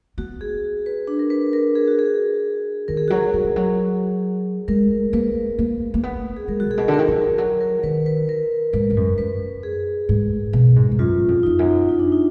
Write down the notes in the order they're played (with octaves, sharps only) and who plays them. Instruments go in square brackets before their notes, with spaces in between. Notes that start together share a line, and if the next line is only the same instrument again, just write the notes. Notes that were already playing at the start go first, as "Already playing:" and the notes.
[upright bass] B3 [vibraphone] F#4
[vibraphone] G#4
B4
D4
A#4
B4
A#4
G#4
F#4
G#4
[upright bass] D#3 [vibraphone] A#4
[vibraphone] G#4
[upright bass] F#3 [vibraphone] F#4
[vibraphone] G#4
[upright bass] F#3
F3
F#3
[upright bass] G#3 [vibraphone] A#4
[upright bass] A#3 [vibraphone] B4
[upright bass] A#3
A#3
B3
[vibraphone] G#4
[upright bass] G#3 [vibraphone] A#4
[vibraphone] F#4
[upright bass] A#2 [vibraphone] G#4
[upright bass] B2
D3
[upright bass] D#3 [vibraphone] A#4
[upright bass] F3
[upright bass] F#3 [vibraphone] A#4
[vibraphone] A#4
A#4
[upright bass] D#3 [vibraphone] B4
[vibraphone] B4
A#4
[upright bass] G#2 [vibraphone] B4
[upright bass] G#2
F#2
[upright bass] F#2 [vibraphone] B4
[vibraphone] G#4
[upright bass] G#2
B2
G#2
G#2
[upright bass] F#2 [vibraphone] F4
[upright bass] F2
[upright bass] F2 [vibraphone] D#4
[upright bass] F#2
[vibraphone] D#4
D4
D#4